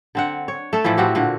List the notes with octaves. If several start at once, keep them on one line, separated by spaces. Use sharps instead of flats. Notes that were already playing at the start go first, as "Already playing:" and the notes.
D3 C4 F#5
C#5
A3 A4
A2 E3 F3 E4
A2 C4 F#4 G4
A#2 D3 F#4